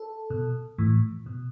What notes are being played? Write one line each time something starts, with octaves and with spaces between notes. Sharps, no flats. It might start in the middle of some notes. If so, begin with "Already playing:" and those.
Already playing: A4
B2
A2 E3
B2